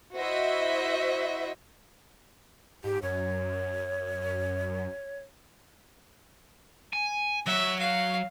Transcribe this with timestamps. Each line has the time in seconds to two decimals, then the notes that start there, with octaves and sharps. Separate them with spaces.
0.16 E4 F#4 C5 D#5 E5
2.84 G#2 G4
3.03 F#2 C#5
6.93 G#5
7.46 F#3 E5
7.79 F5